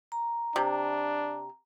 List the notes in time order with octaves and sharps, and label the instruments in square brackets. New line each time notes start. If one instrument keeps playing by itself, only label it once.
[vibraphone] A#5
[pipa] C3 [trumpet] D4